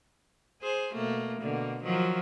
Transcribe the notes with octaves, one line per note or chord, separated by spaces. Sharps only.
G#4 C5
B2 A3 A#3
B2 D3 A#3
D#3 F3 F#3